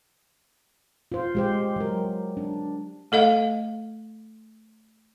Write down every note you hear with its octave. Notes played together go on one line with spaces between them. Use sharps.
F4 C5
G#3 G4 C5
F#3 A#4
D4
A3 A4 D#5 F5